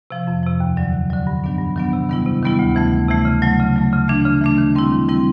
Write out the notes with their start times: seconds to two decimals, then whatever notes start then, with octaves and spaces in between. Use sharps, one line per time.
0.11 C3 F3
0.27 F2
0.43 C3 F3
0.60 D#2
0.77 D3 F#3
0.93 D#2
1.10 D3 F#3
1.27 G2
1.44 D#3 F#3 B3 D4
1.59 G2
1.76 D#3 F#3 B3 D4
1.93 C3
2.09 D#3 G3 B3 E4
2.26 C3
2.43 D#3 G3 B3 E4
2.59 D2
2.75 C3 E3 A3
2.92 D2
3.08 C3 E3 A3
3.25 C#3
3.42 F#3 A3
3.60 C#3
3.76 F#3 A3
3.93 C#3
4.08 E3 A3 D4
4.26 C#3
4.41 E3 A3 D4
4.58 D#3
4.75 G3 C4 E4
4.92 D#3
5.08 G3 C4 E4